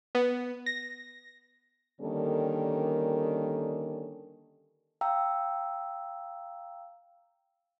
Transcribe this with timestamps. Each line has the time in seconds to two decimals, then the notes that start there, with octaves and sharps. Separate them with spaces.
0.15 B3
0.66 A#6
2.01 D3 D#3 G3 A#3 C#4 A4
5.01 F5 G5 A#5 E6